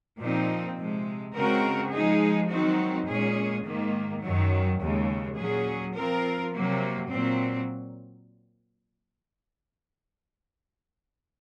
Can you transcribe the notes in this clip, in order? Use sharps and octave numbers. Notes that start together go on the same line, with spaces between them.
A#2 F3 C4 D#4
C3 F3 G#3
C#3 G#3 C4 F#4 A#4
F3 G#3 D#4 G#4
D#3 F#3 C4 D#4 F#4
A#2 G#3 C#4 G#4
G#2 D#3 A#3
F#2 D#3 F#3
D#2 C#3 G#3
A#2 F#3 C#4 G#4
F3 C4 F4 A#4
C3 F#3 A#3
A#2 F#3 C4